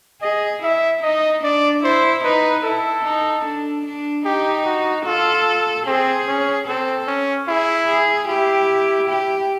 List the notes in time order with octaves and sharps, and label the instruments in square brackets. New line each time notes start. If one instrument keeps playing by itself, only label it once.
[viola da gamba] G#4 [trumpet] D#5
[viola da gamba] E4 [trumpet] E5
[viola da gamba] D#4 [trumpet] D#5
[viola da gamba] D4 [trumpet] D5
[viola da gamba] E4 [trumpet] C5
[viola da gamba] D#4 [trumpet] B4
[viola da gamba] E4 [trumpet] A4
[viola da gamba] D#4
D4
D4
[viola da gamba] D#4 [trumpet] G4
[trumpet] F#4
[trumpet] F4 [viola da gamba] A4
[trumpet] C4 [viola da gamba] G#4
[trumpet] C#4
[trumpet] C4 [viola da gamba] A4
[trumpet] C#4
[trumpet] E4 [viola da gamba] G#4
[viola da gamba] G#4
[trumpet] E4 [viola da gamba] G4
[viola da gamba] G4